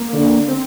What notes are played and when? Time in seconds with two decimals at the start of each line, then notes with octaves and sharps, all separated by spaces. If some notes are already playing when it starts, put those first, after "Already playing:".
Already playing: A#3
0.13 D3
0.48 C4